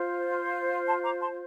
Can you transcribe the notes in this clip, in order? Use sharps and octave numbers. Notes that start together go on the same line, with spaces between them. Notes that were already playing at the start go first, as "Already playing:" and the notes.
Already playing: F4 C5
A5 C6
A#5 D6
A5 C6